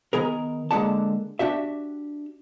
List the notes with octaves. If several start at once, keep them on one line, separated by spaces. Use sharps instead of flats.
D#3 B3 G#4 A#4
D3 G#3 A#3 G4 F#5 A5
D4 F#4 G4 E5